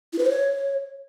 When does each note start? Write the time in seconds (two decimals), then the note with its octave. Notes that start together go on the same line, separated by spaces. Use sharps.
0.13 E4
0.19 B4
0.24 C5
0.30 C#5